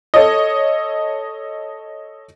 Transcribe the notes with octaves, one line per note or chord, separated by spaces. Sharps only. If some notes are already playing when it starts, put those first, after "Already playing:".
A4 C#5 D#5